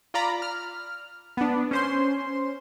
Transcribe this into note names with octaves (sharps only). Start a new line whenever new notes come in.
F4 D5 A#5 B5
F6
B3 D4
C#4 C5 C6